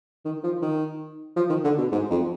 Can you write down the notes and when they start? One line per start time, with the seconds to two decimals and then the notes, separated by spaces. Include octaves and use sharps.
0.25 D#3
0.44 F3
0.62 D#3
1.36 F3
1.50 D#3
1.64 D3
1.78 B2
1.92 G#2
2.11 F2